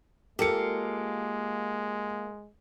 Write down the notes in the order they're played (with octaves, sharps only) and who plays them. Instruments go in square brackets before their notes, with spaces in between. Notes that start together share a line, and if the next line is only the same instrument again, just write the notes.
[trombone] G#3 [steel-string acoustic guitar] A#3 F4 [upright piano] G4 A4 C#7